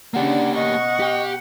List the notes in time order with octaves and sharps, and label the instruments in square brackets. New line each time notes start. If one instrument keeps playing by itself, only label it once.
[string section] C#3 D4 [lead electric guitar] A#3 G4 [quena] F#5
[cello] B2 F#5 [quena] D#5 [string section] C#6
[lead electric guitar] G4 G5